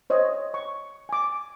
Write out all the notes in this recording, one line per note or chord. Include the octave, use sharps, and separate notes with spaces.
C5 C#5 D#5
C#6
G#5 D6